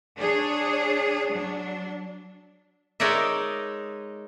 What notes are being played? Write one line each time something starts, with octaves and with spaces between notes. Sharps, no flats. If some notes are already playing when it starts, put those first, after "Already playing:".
D4 G#4 C#5
F#3 D4
G#3 D#4 A#4 C#5 D5 E5